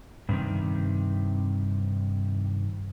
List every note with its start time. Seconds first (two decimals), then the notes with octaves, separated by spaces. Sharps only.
0.29 G2 C3 D#3